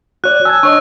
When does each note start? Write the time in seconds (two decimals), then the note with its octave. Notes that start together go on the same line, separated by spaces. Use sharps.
0.24 F#4 C#5 D5 F#6
0.45 G#5 A5 E6 G#6
0.63 D4 C#5 D#5 C#6